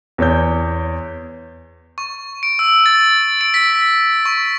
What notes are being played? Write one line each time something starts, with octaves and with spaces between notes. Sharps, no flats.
E2 C#5 G6
C#6
D7
E6
A6
D7
B6
C#6